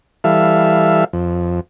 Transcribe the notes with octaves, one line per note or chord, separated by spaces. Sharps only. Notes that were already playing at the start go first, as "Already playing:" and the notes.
E3 G3 A4 E5 F5
F2